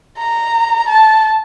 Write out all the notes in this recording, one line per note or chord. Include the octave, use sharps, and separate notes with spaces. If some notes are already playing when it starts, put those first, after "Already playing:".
A#5
A5